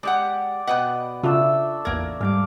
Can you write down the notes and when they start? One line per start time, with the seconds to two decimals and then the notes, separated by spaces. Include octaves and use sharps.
0.03 G#3 G4 D5 F#5
0.67 B2 B4 D#5 F#5 G5
1.23 C#3 A3 D4 F4 E6
1.85 A1 E2 A#3 A#4 G#6
2.21 G#2 G3 F5 D6